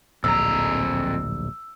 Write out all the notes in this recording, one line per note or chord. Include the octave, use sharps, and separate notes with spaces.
D1 A#1 F2 A#5 E6